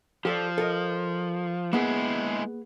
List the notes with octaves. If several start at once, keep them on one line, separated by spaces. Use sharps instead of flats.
F3 G4 A4 D5
A4 A#4 D#5
G#3 A#3 B3 E4 G#4